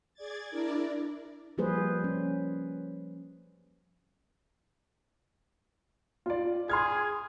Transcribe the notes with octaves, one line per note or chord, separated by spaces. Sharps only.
G#4 D5 G#6 A6
D4 E4 A#4 D5
F3 G3 A#3 G#4 B4 C5
C#4
F4 D5
G#4 C6 F6 G#6